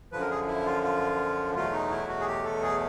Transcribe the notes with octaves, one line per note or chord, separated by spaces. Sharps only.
F#2 D3 F3 B4
A#4
G#4
E4
F4
F4
E2 B2 F#3 A3 F4
D#4
E4
F#4
G#4
G4
A4
G#4